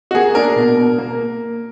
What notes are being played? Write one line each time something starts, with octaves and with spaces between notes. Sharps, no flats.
F#4
A#3 G#4
D4 A#4
B2
B2
A#3